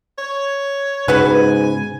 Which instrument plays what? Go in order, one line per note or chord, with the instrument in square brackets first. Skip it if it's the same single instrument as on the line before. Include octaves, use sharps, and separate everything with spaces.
[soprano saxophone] C#5
[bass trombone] G#2 [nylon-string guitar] C#3 [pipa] B3 F#4 B4 [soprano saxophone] G#5